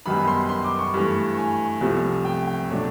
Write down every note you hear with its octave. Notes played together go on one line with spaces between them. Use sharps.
F#2 D#3 G3 B3 B5
C6
C6
D6
C#6
G2 E3 A3
G#5
C2 C3 F3 A3
G5
G5
B2 F#3 A3 D4